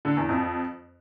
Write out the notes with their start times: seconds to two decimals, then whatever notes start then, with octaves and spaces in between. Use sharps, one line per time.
0.05 D3
0.17 E2
0.29 F2